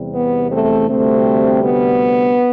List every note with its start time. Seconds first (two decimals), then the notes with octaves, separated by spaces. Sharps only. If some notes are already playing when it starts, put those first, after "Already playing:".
Already playing: E2 C3 G3
0.15 B3
0.52 A3 C4
0.89 D2 C3 G3 A3 C4
1.64 B3